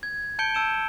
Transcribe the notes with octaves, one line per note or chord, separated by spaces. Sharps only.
G#6
A5 G6 C#7 D7 G7
A5 E6 D7 E7